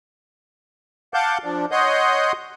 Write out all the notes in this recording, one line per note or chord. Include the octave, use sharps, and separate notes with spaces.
F5 F#5 A5 D6 G6
F3 D4
C#5 D#5 F#5 C6 D#6 G6